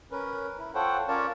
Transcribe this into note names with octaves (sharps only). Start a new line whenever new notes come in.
C#4 A#4 B4
E4
F4 A4 C5 C#5 F#5 G5
C#4 F4 A#4 C#5 D5 A5